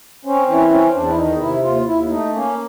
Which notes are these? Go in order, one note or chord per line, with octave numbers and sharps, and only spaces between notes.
C4 C#4
E3 C#4
C4 C#4
E2 D4
E4
D#3 D#4
C3 E4
D#2 F4
D#2 E4
E4
A3 D#4
A#3 C#4